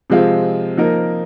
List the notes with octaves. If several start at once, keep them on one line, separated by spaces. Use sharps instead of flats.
C3 F3 G#3 C4 F4
F3 A#3 D#4 A#4